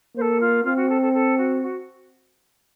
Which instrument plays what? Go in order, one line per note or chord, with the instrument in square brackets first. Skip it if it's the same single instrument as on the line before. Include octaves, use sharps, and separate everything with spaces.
[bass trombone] A#3 [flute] C5
[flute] A4
F4
[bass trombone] C4 [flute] F4
[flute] F#4
A4
A4
A4
F#4
F#4